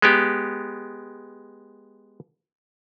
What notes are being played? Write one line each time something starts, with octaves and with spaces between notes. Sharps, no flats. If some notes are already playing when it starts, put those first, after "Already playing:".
G#3 B3 G4